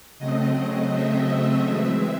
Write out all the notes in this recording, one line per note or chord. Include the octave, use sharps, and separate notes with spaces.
C#3 F#3 A3 C4 D#5
E5
E3 G#3 C4